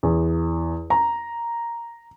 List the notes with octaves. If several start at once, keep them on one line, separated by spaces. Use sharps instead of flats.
E2
A#5